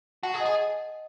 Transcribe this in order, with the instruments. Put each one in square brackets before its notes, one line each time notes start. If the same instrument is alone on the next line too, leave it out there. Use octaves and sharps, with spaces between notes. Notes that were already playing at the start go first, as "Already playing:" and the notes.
[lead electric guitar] F#4 [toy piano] F#5 A5
[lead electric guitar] G#4
[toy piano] D#5 F#5
[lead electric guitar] G#4